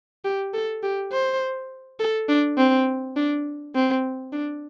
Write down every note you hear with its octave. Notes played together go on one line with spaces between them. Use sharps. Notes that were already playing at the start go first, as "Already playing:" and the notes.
G4
A4
G4
C5
A4
D4
C4
D4
C4
D4